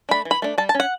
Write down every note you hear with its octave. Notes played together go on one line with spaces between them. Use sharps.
A3 D4 B5
E3
B5
A3 D4
G3 A5
A5
C#4
F#5